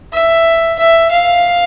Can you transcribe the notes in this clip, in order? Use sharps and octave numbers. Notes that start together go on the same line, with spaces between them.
E5
E5
F5